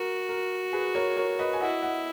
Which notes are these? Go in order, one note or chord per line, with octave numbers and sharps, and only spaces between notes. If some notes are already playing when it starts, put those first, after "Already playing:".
Already playing: F#4 A#4
A#4
G#4 B4
A#4 C#5
A#4 C#5
B4 D#5
G#5
E4 D#5 F#5
D#5 F#5